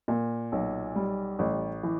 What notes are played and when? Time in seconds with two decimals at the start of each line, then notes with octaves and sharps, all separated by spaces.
0.08 A#2
0.52 B1
0.96 G3
1.39 A1
1.83 E3